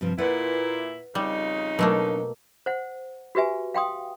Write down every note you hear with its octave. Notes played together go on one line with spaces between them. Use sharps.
G2 C3 F3
A#2 E4 B4 D5 F#5
F2 C#3 G3 D#4
B2 F#3 A3 A#3 D4
C5 F#5
F#4 G4 B4 E5 G#5
F5 G5 C6 D#6